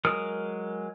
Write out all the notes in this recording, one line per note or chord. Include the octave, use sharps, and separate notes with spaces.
F#3 G#3 A#4 D#6 F6